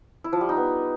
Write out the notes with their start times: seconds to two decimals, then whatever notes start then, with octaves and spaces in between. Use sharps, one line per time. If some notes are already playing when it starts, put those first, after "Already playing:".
0.24 E4
0.33 F3
0.41 G3
0.49 D#4
0.57 B3